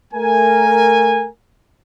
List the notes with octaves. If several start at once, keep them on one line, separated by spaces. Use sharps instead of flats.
A3 A#4 G#5